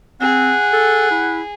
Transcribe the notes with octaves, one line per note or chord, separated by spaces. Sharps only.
C4 G#4 F#5
A4
E4